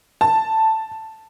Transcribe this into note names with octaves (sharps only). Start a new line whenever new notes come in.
A5